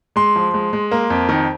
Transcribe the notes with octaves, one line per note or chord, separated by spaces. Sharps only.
G#3 C6
F3
G#3
G#3
A#3
F2
D#3